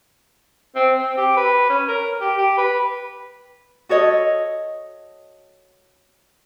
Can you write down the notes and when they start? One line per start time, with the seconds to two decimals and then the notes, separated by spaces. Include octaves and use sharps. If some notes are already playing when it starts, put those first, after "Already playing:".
0.76 C4
0.98 C4
1.17 G4
1.37 B4
1.69 C#4
1.88 A#4
2.21 G4
2.38 G4
2.58 B4
3.89 F#4 A4 C#5 D#5